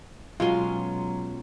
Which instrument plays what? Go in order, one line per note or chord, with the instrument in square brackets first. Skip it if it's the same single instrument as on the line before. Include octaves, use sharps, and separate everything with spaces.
[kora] B2 G#3 C#4 [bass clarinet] F#3 [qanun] F4 C6